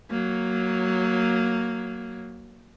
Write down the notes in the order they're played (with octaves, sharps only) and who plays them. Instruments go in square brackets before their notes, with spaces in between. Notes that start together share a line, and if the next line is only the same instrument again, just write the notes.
[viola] F#3 A#3